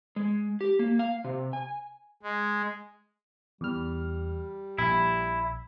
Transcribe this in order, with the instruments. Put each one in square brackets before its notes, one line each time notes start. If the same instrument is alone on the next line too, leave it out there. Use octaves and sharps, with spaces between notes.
[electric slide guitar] G#3
G4
A#3
F5
C3
G#5
[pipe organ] G#3
[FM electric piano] E2 F6 [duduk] G3
[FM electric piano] A#1 [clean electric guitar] E4